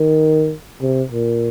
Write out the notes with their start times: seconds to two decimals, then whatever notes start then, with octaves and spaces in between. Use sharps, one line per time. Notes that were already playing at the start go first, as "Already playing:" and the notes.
Already playing: D#3
0.81 C3
1.12 A#2